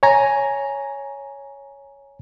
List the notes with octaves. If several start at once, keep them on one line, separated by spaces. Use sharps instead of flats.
C#5 G#5 A#5